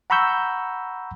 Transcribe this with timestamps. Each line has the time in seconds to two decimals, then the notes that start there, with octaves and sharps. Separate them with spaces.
0.10 F#5 A#5 B5 C#6 E6 G6